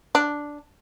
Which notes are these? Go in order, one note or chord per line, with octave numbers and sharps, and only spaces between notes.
D4